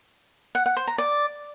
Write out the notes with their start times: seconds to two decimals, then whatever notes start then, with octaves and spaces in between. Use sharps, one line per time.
0.55 F#5
0.66 F#5
0.77 C5
0.87 A#5
0.98 D5